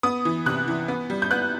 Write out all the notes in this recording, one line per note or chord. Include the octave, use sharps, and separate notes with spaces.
B3 D#6
E3
C3 F#6
E3
B3
G3
G6
B3 F#6